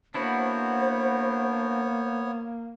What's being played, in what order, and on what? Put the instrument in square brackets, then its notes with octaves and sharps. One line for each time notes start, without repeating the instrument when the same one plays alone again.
[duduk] A#3 [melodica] B3 C#5 [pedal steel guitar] D4 E4 F#4 [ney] C5